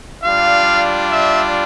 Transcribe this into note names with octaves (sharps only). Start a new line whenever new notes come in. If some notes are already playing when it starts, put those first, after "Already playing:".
G3 D4 F4 F5
E5